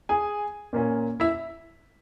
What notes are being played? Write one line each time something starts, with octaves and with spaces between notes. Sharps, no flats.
G#4 G#5
A#2 A#3 C#4
E4 E5